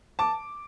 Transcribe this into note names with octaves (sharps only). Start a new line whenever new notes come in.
A5 D6